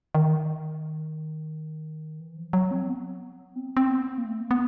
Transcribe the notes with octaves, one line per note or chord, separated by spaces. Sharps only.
D#3
E3
F3
F#3
C4
B3
C4
C4
B3
A#3
A3
A#3
B3